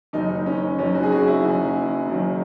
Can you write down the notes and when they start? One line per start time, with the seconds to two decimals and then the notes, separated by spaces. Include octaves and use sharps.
0.13 F#1 F#2 D#3 D#4
0.46 C#4
0.79 F#1 F#2 D#3 C#4
0.95 F#4
1.03 G#4
1.12 F#4
1.28 E4
1.44 F#1 F#2 D#3 F#4
2.09 F#1 F#2 D#3